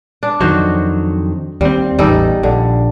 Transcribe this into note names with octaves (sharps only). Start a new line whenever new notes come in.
D4
F2 D#3 F#3 F#4 C5
D#2 G3 C4
A1 E2 G3 D#4 A4
A#1 D3